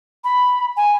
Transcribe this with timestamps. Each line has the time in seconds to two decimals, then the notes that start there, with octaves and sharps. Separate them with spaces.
0.24 B5
0.76 G#5